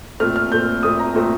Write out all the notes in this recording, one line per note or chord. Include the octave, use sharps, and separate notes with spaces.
A#2 A3 C4 F6
F6
A#2 A3 C4 G6
A#2 A3 C4 D#6
A#5
A#2 A3 C4